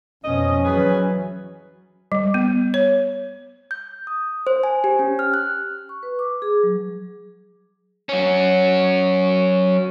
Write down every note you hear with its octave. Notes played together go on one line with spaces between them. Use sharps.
F2 B2 C#4 D#5
E3 F#3 B3 G#4 B4
G3
B3
C#5
G6
D#6
C5
G#5
G4
C#4
F6
F#6
C#6
B4
D6
G#4
F#3
F#3 C#4